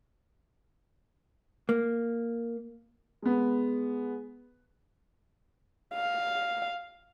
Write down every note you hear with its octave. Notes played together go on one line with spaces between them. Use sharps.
A#3
G#3 B3
F5